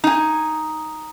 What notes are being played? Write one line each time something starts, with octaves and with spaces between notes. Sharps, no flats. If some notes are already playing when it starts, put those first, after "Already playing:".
D#4 G#5